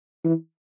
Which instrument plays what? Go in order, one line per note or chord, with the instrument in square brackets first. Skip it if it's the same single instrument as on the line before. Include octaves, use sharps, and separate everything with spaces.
[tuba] E3